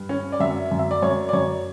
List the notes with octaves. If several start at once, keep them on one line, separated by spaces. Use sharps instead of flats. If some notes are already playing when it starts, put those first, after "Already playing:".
Already playing: G2
C#4
D5
F#2 E5
F#2
E5
D5
F#2 C#5
D5
F#2 C#5